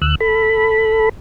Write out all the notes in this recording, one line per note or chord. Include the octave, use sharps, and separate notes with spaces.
D2 E6 F#6
A4 B5